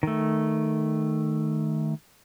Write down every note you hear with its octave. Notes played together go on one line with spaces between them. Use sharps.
D#3 A3